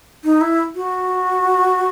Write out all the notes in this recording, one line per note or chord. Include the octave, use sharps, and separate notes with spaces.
D#4
E4
F#4